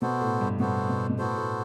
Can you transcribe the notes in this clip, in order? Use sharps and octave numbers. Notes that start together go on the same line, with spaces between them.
B2 B3 F#4 A4 C5
A2
G2
B2 B3 F#4 A4 C5
B2
B2
A2 B3 F#4 A4 C5
A2